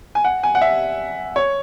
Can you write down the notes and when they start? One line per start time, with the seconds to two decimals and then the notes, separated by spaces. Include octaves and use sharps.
0.15 G#5
0.24 F#5
0.43 G#5
0.55 F#5
0.61 E5
1.36 C#5